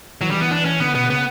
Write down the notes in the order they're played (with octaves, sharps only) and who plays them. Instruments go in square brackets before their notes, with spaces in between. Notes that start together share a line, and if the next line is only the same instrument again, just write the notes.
[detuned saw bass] E3 [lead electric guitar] F#3
[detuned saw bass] D3 [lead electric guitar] G3
[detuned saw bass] E3
[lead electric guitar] B3
D4
C#4
[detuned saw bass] D3 [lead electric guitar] B3
[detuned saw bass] B2 [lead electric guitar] B3
[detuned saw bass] C#3 [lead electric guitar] B3